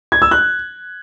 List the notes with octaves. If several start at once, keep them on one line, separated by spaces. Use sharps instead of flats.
G#6
E6
F#6